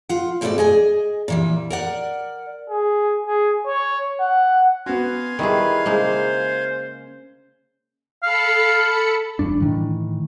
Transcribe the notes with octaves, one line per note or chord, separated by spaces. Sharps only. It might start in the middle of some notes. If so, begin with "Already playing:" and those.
F4 F#5
G#2 B2 A3 E4 B4 D5
G#4 D#5 G#5
A#2 E3 G3
A#4 D5 F#5
G#4
G#4
C#5
F#5
B3 F#4 F5 G#5 C6
D#3 G3 E4 G#4 B4
C#3 G#3 A#3 C5
A4 F5 B5 C#7
E1 G2 D4
A2 C3 D#3 E3